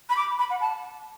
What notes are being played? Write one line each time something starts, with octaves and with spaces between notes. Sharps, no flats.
B5
D6
B5
F#5
A5